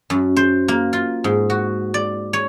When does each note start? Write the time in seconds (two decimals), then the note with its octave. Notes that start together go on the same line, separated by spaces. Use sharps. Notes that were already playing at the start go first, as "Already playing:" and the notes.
0.10 F#2
0.36 C5
0.68 A#3
0.93 F4
1.24 G#2
1.50 F#4
1.94 D5
2.33 C#5